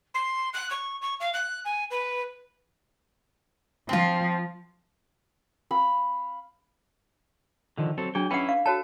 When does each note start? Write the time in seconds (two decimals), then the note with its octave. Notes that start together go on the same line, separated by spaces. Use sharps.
0.14 C6
0.53 F#6
0.70 C#6
1.01 C#6
1.20 F5
1.33 F#6
1.64 G#5
1.90 B4
3.89 F3 C4 F4
5.71 F5 B5
7.78 D3 D#3 F3
7.98 F#3 C4 A4
8.15 F#3 D4 G#4 G5
8.31 C#4 E4 B4 F#5 G5
8.49 F5
8.66 F#4 A4 C#5 A5